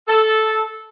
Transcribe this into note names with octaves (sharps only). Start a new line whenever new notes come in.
A4